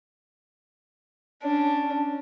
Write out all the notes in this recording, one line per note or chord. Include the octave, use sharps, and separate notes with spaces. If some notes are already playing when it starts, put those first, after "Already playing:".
C#4 D4